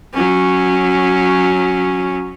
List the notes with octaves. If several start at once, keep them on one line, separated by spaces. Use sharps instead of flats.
F#3 C#4